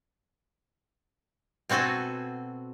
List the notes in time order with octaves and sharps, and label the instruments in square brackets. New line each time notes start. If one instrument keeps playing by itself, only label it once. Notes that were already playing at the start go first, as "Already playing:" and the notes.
[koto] B2 C4 F#4 A4 G#5